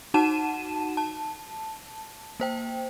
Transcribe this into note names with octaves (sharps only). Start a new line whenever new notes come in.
D#4 F#4 F#5 A5 D#7 E7
A5
A#3 C5 G5